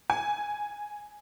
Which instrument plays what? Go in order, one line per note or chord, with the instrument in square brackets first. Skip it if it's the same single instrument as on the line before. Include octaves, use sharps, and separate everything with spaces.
[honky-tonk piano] G#5